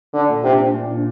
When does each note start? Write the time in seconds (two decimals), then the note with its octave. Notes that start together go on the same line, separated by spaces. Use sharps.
0.14 D3 D4
0.29 A#2
0.44 C3 D4
0.59 D4
0.74 A#2
0.90 D4